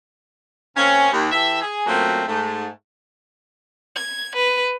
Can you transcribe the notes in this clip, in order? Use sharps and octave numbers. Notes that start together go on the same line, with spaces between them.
C3 A#3 C4 C#4
D#2
E3 G4 A4 E5
G#4
F#2 A#2 F#3 A3 A#3 C4
G#2 A3
G#6
B4